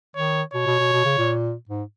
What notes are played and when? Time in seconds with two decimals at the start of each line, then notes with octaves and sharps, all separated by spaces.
0.16 D#3 C#5
0.54 B2 C#5
0.67 B2
0.80 B2
0.93 B2
1.05 C#3
1.18 A#2
1.69 G#2